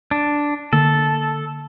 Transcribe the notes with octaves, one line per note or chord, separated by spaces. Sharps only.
D4
D3 A#3 A4